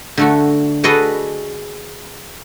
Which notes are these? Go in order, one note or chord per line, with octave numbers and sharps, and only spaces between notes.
D3 A3 F#4
F#4 G#4 A4 B4 D5 D#5